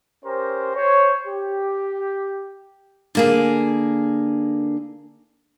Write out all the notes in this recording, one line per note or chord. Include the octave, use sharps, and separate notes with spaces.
C#4 G4 A#4 C5
C5 C#5
G4
D3 A#3 G#4